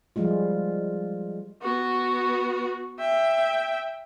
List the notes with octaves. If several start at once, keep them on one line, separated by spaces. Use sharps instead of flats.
F3 G3 G#3 F4
B3 F#4
E5 G5